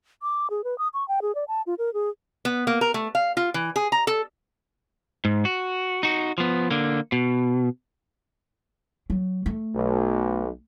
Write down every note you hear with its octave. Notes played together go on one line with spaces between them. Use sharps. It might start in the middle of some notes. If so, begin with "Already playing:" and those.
D6
G#4
B4
D#6
C#6
G5
G#4
D5
A5
F4
A#4
G#4
B3
A#3
A#4
A3
F5
F4
E3
G#4
A#5
A4
G#2
F#4
D#4 F#4
F3 B3
D3 A#3
B2
F#3
A3
B1